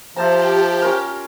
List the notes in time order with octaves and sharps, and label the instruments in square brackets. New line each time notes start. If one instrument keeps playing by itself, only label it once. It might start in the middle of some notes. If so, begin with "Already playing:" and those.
[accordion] F3 [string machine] G4 [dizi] C5 [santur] E5 A5 A#5
[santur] C#4 F4 A#4